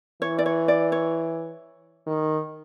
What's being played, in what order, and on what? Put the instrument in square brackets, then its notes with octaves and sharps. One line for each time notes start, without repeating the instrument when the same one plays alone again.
[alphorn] E3 [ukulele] C#5
[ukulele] D5
C#5
D5
C#5
[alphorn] D#3